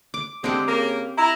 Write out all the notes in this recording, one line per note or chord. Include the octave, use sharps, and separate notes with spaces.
D6
D3 G#3 C4 G4
C#3 A#3
E4 A#5